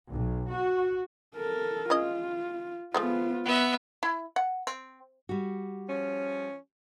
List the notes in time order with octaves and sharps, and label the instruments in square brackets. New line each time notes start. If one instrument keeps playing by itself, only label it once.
[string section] B1
F#4
[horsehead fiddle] A4 A#4
[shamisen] G#3 C#4 D#5 [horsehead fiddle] F4
[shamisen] F3 G#3 A3 [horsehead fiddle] B3 F4
[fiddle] B3 E5 [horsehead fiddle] F#5
[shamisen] E4
F#5
C4
[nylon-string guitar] G3 F#4
[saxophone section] F3 C#4